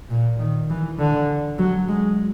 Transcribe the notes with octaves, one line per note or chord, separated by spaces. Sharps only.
A#2
D#3
E3
D3
F#3
G#3